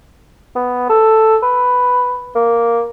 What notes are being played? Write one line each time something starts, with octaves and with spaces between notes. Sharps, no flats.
B3
A4
B4
A#3